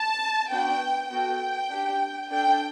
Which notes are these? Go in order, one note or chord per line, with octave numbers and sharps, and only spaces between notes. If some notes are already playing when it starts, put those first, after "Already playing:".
Already playing: A5
B3 D4 F#4 G5
B3 F#4 A4 G5
D4 G4
D4 A4 G5